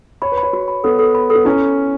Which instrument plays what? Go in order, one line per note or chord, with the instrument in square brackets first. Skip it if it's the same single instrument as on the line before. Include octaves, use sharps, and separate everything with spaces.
[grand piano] C#5 [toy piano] B5
[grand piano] B4
[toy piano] B5
[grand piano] C#5
[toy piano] F#4
B5
[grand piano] B3 [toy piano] A4
[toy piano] A4
B5
A4
[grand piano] B3
[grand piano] C#4 [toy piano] E4